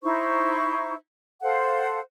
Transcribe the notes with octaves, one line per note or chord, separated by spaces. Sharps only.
D#4 E4 C5 C#6
A4 C5 F5 F#5